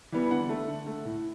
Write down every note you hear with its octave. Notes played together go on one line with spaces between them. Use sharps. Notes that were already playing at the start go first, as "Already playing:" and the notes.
E3 G3 B3
D3 F#5
A3
D3
A3
A2